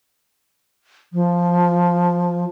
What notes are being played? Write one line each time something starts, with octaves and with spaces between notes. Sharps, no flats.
F3